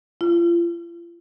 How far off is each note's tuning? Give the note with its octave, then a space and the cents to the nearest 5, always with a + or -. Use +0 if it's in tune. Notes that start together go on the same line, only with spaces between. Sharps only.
F4 -40